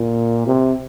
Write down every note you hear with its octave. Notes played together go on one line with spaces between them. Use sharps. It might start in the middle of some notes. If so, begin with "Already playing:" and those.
Already playing: A#2
C3